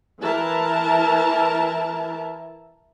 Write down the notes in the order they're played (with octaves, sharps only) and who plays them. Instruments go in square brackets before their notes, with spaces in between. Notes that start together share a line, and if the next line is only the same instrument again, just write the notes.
[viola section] E3 E4 A#4 A5